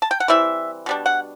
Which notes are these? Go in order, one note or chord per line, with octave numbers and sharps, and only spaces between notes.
A5
G5
F#5
E3 G3 C4 E4 E5
B2 G3 D4
F#5